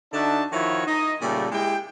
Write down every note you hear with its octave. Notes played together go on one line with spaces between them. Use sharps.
D3 D4 D#4 F#4 E5 A5
D#3 F3 E4 F#4 C#5
D#4 D#5
A#2 C#3 G3 A3
G#3 E4 G4 G5